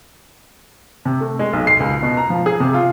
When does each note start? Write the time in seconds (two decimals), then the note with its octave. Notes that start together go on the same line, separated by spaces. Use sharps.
1.05 C3
1.20 A3
1.39 G#3
1.53 B1
1.67 C7
1.80 C#2
2.02 B2
2.17 A#5
2.30 F3
2.46 G#4
2.60 C3
2.74 F4